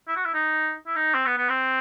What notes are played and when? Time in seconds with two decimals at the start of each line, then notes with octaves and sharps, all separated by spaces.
0.08 E4
0.16 F#4
0.25 E4
0.34 D#4
0.87 E4
0.96 D#4
1.14 C4
1.26 B3
1.38 B3
1.49 C4